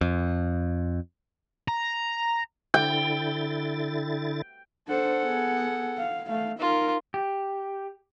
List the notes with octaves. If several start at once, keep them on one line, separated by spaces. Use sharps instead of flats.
F2
A#5
D3 E4 G5 A6
D4 A4 C5 F#5
B3 G#4
F5
A3 F5
D#4 F4 A#4
G4